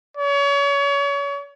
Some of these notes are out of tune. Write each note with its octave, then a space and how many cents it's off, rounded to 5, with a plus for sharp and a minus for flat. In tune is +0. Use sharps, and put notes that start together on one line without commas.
C#5 +35